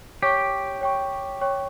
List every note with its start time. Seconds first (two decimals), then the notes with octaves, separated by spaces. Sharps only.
0.23 G4 C#5 G5 C#6
0.81 C#5 G5 C#6
1.41 C#5 G5 C#6